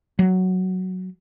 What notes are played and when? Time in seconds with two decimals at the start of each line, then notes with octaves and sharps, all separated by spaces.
0.19 F#3